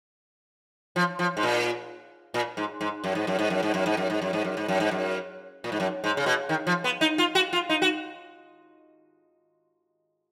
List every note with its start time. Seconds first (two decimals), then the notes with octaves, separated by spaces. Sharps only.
0.96 F3
1.19 F3
1.37 G#2
1.43 A#2
2.34 A#2
2.57 G#2
2.81 G#2
3.04 F#2
3.15 G#2
3.27 F#2
3.39 G#2
3.50 F#2
3.63 G#2
3.74 F#2
3.86 G#2
3.97 F#2
4.10 G#2
4.22 F#2
4.33 G#2
4.44 F#2
4.57 G#2
4.68 F#2
4.80 G#2
4.91 F#2
5.64 A#2
5.72 G#2
5.80 F#2
6.04 G#2
6.17 C#3
6.26 B2
6.49 D#3
6.67 F3
6.84 B3
7.01 D#4
7.18 F4
7.35 F#4
7.53 F4
7.69 D#4
7.82 F#4